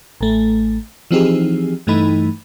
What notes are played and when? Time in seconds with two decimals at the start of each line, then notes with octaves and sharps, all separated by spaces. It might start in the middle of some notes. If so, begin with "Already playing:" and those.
0.21 A1 A3
1.11 E3 F3 C4 D#4 G4 G#4
1.87 G2 E3 A3 D#4 B5